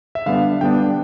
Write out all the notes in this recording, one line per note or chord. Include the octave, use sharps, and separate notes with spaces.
E5
D3 G3 B3 D4 F5
D3 G3 B3 D4 G5